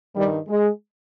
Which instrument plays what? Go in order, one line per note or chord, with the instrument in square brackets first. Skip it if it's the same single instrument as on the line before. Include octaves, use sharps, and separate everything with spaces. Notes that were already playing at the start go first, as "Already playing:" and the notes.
[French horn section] G2 D#3 G3
G#3